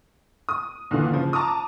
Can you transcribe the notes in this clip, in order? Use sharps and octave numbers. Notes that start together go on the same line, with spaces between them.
D#6
D#2 A#2 D3 E3
C#3 F3
A5 A#5 D6 D#6